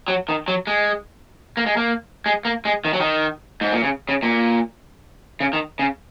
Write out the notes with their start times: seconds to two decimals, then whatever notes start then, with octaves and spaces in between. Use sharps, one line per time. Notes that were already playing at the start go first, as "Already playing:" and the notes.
0.08 F#3
0.29 D#3
0.48 F#3
0.67 G#3
1.57 A#3
1.66 G#3
1.77 A#3
2.26 G#3
2.45 A#3
2.65 G#3
2.85 D#3
2.93 F#3
3.01 D#3
3.61 G#2
3.72 A#2
3.83 C#3
4.09 C#3
4.23 A#2
5.40 C#3
5.53 D#3
5.79 C#3